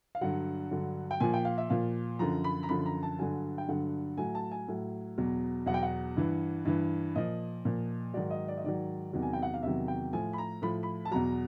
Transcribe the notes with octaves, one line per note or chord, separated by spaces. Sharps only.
F5
G2 D3 F#3 F#5
G2 D3 F#3
G5
A#2 F3 G#5
G5
F5
E5
A#2 F3 F5
F#2 D3 F3 A#5
B5
A#5
F#2 D3 F3 B5
A#5
A5
G2 D3 F#3 G#5
G5
G2 D3 F#3 F#5
A2 F#3 G#5
A5
G#5
A2 F#3
E2 B2 F#3
E2 B2 F#3 F#5
G5
F#5
G2 E3
G2 E3
A#2 F3 D#5
A#2 F3
G#2 D#3 F#3 D5
D#5
D5
D#5
G#2 D#3 F#3 D5
E2 C3 D#3 F#3
G#5
G5
F#5
F5
E2 C3 D#3 F#3 E5
G5
A2 F3 G#5
B5
A#5
A2 F3 B5
B5
A5
E2 B2 F#3 A#5